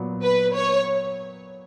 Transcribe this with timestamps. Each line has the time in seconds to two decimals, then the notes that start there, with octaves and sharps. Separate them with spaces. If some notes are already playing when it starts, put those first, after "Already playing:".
Already playing: A#2 F#3 B3
0.23 B4
0.55 C#5